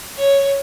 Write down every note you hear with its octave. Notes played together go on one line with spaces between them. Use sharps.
C#5